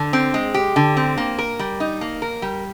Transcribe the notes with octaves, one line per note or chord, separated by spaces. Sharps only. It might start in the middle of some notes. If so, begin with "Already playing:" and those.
Already playing: D3
C4
G#3
G4
D3
C4
A#3
A#4
G3
D#4
A#3
A#4
G3